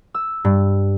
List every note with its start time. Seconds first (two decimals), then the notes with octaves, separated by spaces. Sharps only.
0.14 E6
0.45 G2